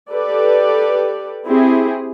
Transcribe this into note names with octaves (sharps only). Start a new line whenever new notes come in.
G4 A4 B4 D5
C4 E4 G4 G#4